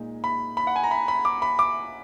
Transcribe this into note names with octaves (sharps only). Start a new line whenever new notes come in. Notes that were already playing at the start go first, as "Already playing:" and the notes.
Already playing: A#2 G#3 D#4
B5
B5
F#5
G#5
A#5
B5
B5
D6
B5
D6